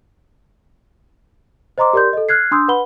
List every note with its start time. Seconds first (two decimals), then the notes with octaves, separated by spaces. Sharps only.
1.78 C5 D#5 A#5 C6 D6
1.93 G4 A#4 D5 C6 G6
2.13 A4 D#5
2.29 F6 F#6 G#6 C7
2.51 D4 C6 D#6 E6 G6
2.68 B4 F#5 B5 G7